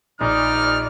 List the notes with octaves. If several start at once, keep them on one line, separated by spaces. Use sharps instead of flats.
A#1 D#4 D5 F6